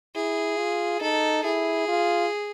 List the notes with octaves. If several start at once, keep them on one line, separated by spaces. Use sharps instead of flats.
E4 G#4
F4
D#4 A4
E4 G#4
F4